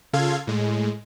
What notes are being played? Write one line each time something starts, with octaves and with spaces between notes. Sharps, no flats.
C#3 F4 A4 F5 G#6
A2 G#3